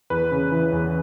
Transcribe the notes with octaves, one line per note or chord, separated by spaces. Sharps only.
E2 B4
C#3
E3
E2